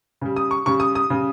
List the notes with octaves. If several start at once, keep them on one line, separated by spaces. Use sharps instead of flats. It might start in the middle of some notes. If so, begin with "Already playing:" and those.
C#3 G3
D#6
C#6
C#3 G3 C#6
D#6
D#6
C#3 G3